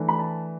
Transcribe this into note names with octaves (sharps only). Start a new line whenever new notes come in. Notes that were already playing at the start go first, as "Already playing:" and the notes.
Already playing: E3 A3 D4
B5
A5